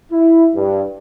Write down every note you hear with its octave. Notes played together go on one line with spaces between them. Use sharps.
E4
G2